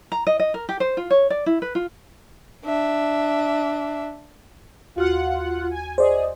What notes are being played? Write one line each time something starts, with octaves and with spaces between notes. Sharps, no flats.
A#5
D#5
D#5
A#4
G4
C5
F4
C#5
D5
E4
B4
F4
D4 E5
D#2 F4 F#4 F#5 F6
G#5
G#4 C5 D5 D#5